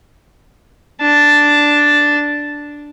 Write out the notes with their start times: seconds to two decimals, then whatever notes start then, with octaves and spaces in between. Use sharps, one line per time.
1.01 D4 A5